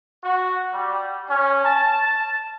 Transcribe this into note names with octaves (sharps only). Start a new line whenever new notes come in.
F#4
G3
C#4
A5